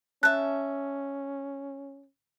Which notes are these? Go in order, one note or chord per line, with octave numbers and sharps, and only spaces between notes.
C#4 E5 A5 F#6